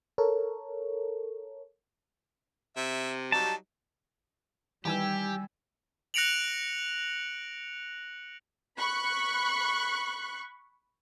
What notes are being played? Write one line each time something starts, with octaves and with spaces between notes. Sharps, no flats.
A4 A#4 C#5
C3 E5
F#3 G3 D#4 A5
D#3 E3 G3 G4 G5 G#5 E6
F#6 A#6 C#7 D7 F7 F#7
B5 C#6 F#6